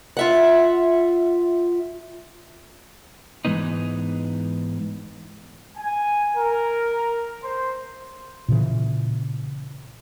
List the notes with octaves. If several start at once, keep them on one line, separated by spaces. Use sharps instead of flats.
F4 E5 F#5
G#2 E3 G#3 B3 D#4
G#5
A#4
C5
A#2 C#3 E3